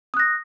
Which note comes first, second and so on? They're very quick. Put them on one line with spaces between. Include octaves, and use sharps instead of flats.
D#6 F#6 A#6